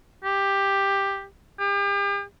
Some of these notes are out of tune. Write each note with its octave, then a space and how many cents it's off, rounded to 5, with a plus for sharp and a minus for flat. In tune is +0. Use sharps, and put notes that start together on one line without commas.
G4 +10
G4 +40